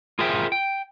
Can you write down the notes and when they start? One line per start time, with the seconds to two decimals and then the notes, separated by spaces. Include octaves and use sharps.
0.19 F4 G#4 A#4 C5 E5 G5
0.52 G5